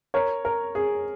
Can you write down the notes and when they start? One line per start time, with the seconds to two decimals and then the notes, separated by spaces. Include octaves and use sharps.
0.14 A#4 C#5
0.45 A#4
0.75 G#4